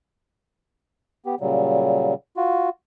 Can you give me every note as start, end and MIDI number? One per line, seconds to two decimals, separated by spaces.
1.26 1.35 59
1.26 1.35 67
1.41 2.14 46
1.41 2.14 49
1.41 2.14 54
1.41 2.14 55
2.37 2.69 65
2.37 2.69 66